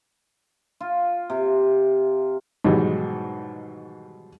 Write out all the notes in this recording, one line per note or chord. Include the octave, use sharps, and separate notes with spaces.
F4
C3
G#2 B2 D#3 E3 F#3 G3